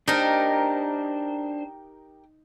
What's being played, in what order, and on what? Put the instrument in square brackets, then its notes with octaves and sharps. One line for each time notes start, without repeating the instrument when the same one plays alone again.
[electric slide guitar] D4 C5 [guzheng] D#4 [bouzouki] G4 A#4